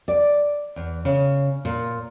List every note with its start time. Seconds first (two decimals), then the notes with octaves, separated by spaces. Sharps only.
0.08 D5
0.76 E2
1.05 C#3
1.65 A#2